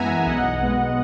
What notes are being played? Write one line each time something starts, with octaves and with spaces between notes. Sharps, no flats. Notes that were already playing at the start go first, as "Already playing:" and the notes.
Already playing: F#2 E3 G#3 B3 E5 F#5 G#5 A#5
B1 D#5 F#5
B2 G#3 B3